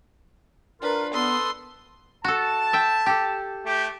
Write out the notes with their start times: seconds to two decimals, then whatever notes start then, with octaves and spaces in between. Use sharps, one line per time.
0.82 D4 F4 A#4 B4
1.13 B3 A4 B4 C6 D#6
2.24 F#4 A4 A5
2.73 E5 G5
3.06 G4 A4
3.65 A3 G4